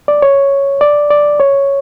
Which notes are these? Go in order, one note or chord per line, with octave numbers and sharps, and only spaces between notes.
D5
C#5
D5
D5
C#5